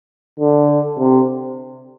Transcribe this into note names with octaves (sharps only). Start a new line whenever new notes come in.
D3
C3